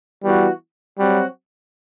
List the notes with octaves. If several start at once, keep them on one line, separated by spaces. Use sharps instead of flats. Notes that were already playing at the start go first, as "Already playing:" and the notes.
E3 G3 B3 F#4
F#3 G3 C4 F#4